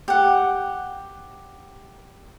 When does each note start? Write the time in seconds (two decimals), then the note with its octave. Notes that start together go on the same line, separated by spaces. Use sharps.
0.08 G4 F#5